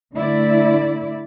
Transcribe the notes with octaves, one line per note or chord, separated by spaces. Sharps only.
D3 A3 E4 D5